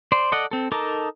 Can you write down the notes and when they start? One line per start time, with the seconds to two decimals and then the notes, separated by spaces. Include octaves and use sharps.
0.12 C5 D5
0.32 A4 D5 D#5 F#5
0.51 C4 A4
0.72 D#4 A4 A#4 A5 D6